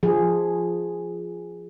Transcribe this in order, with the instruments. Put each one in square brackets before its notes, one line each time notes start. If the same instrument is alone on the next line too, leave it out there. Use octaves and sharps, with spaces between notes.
[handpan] F3 G#4